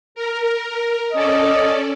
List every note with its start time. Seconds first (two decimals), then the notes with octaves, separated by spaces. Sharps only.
0.15 A#4
1.13 C#4 A4 D5 D#5